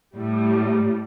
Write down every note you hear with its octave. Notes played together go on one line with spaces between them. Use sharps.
A2 G3